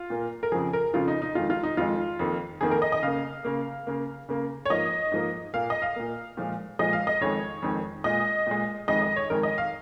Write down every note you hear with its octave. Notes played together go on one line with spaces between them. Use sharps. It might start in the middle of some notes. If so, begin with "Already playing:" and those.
Already playing: F4
A#2 A#3
A#4
F2 C#3 F3 G#4
A#4
F2 C#3 F3 F4
D#4
D#4
F2 D#3 G#3 F4
F4
D#4
F2 D#3 G#3 F4
F2 D#3 A#3
F2 D#3 A#3 G#4
A#4
D#5
D#5
C#3 A#3 F5
C#3 A#3
C#3 A#3
C#3 A#3
C#5
G#2 F3 A#3 D#5
G#2 F3 A#3
A#2 A#3 F5
D#5
F5
A#2 A#3
A#2 F3 G#3
A#2 F3 G#3 D#5
F5
D#5
F2 D#3 G#3 C#5
F2 D#3 G#3
A#2 G#3 D#5
A#2 G#3
F2 D#3 G#3 D#5
D#5
C#5
F2 D#3 G#3 A#4
D#5
F5